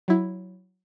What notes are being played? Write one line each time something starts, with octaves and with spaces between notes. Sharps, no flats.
F#3 E4